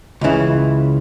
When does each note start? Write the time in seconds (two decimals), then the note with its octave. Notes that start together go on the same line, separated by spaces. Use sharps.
0.21 C#2 C#3 E3